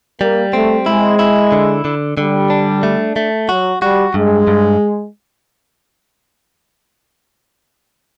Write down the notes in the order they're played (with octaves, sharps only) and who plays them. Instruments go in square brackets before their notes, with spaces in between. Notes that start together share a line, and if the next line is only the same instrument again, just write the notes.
[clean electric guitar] G3 [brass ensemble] A#3
[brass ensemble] A3 [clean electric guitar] C4
[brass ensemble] G#3 [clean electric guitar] E4
[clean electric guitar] E4
D3
D3
[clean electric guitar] D3 [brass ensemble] G3
[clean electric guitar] D4
A3
A3
[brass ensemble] F#3 [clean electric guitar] F#4
[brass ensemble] G3 [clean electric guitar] F#4
[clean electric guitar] G2 [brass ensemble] G#3
[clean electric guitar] G2